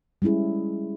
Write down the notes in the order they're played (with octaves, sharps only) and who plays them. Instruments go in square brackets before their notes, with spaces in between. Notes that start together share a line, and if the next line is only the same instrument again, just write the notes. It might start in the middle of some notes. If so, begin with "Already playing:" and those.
[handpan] G3 G#3 C#4 E4 G#4